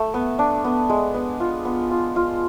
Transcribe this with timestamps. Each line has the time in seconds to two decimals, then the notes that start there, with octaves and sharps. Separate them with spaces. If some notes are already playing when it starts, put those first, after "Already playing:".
Already playing: A3
0.14 B3
0.39 D4
0.64 B3
0.90 G#3
1.14 B3
1.40 F4
1.65 B3
1.91 F4
2.16 F4